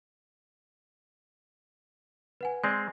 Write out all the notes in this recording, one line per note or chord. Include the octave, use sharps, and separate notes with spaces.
B4 F#5 G#5
G#3 C4 D5 G#5